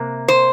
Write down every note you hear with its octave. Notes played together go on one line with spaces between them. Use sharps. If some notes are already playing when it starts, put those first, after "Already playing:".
Already playing: C3 A#3
C5